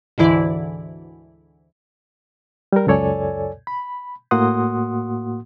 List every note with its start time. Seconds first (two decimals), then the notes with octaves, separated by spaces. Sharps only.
0.18 D2 G#2 D3 E3 E4 D5
2.73 G3 A#4
2.87 C#2 F#2 A4 C#5 D5 G#5
3.67 B5
4.31 A2 A#3 F#4 F#5 C6 D#6